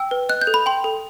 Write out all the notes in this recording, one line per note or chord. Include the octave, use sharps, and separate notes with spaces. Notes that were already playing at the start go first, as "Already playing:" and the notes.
Already playing: G5 E6
B4
D#5 F#6
G6
A4
B5
G5 C6
A4